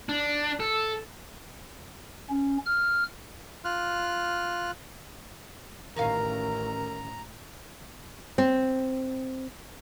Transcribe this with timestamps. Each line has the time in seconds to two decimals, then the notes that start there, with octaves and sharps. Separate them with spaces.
0.09 D4
0.60 A4
2.30 C#4
2.66 F6
3.64 F4 F6 F#6
5.96 A1 D#3 C#4 A#4 F5 A#5
8.38 C4